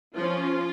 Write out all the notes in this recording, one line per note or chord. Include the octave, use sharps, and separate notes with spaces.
F3 C#4 F4